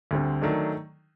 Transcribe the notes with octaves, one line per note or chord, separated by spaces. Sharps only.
D2 D3 G3 C4
D#3 F#3 A3 D4